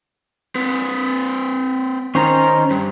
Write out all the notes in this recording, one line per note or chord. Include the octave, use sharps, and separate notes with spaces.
C4 B4
D#3 C#4 C5 A#5
G2